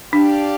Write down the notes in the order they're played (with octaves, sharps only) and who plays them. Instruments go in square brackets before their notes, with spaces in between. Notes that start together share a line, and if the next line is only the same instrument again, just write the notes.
[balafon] D4 [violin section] G4 D5 F5 A5